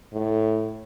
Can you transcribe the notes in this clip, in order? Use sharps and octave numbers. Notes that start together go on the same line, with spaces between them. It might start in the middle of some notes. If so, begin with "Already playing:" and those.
A2